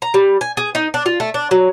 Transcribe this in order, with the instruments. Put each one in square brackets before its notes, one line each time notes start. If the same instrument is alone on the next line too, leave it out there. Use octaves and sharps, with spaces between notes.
[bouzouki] A#5
G3
G#5
G#4
D#4
D4
F4
A3
D4
F#3